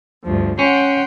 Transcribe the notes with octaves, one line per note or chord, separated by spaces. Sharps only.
D2 G2 F3
C#4 F#5 G5 C6